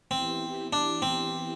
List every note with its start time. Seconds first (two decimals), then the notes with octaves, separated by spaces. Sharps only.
0.11 E3 B3 C4 E4 G4
0.73 D4
1.02 C4